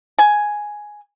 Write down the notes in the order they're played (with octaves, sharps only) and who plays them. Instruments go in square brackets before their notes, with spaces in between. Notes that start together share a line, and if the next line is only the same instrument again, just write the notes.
[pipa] G#5